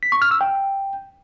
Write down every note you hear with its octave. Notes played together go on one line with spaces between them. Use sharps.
B6
C#6
F6
E6
G5